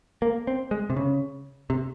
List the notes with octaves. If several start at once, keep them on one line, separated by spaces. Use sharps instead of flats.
A#3
C4
G#3
C3
C#3
C3